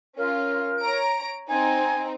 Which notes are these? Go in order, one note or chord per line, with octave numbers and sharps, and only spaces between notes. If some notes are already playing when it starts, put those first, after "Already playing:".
C#4 F4 A#4
C#5 A#5 D7
C4 D#4 G#5